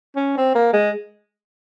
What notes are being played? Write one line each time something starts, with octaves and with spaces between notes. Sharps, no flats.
C#4
C4
A#3
G#3